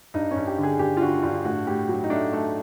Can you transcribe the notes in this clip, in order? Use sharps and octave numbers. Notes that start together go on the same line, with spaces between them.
G2 D#4
G2 C#4
G4
D3
G#4
G2 G4
F4
D3 F#4
G2 F4
A2 F#4
A2 G4
F#3
D#4
A3 D4
A3